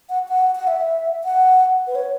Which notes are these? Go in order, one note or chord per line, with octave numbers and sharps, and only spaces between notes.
F#5
F#5
F#5
E5
F#5
B4
C#5